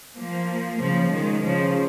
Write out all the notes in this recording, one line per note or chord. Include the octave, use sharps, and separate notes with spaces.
F3 A#3
C#3 F3
D#3 G#3
C#3 F3